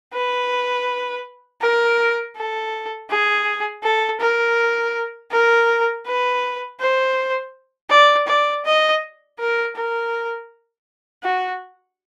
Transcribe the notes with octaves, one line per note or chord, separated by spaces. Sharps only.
B4
A#4
A4
G#4
A4
A#4
A#4
B4
C5
D5
D5
D#5
A#4
A#4
F#4